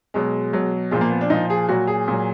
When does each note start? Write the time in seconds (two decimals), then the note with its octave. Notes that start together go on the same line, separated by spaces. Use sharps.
0.14 B2 F#3 G#3
0.53 B2 F#3
0.91 A#2 F3 G#3
1.01 A#3
1.10 B3
1.21 D4
1.30 A#2 F3 D#4
1.50 G#4
1.69 A#2 F#3 F#4
1.87 G#4
2.08 A#2 F#3